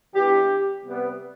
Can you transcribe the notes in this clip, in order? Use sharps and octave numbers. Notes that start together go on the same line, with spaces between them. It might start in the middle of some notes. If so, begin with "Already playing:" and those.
E3 B3 D4 G4
C3 G3 B3